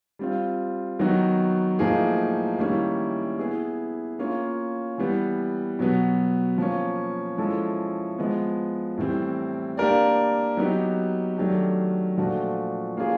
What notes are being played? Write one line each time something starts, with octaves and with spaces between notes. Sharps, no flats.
G3 C4 F4
D#3 F#3 B3 D#4 F#4
A2 F3 A#3 D#4 G#4
D#3 G3 A#3 C#4 E4
B3 E4 G#4
A#3 C#4 F4
E3 G3 B3
B2 F#3 B3
F3 A#3 C#4
F3 G#3 C#4 E4 A4
F3 G#3 B3
A2 E3 G3 C4
A#3 D4 G4 A#4 D5
F#3 B3 D#4 G4
D#3 F#3 A3 D4 G4
A#2 F3 A3 D4 F#4
A#3 C#4 F4 G#4